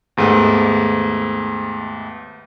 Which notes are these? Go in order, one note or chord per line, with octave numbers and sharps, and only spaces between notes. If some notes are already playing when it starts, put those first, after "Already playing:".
D#2 G#2 A3 B3